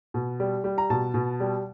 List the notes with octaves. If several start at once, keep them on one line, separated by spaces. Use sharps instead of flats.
B2
G3
G3
A#5
B2 A5
B2
G3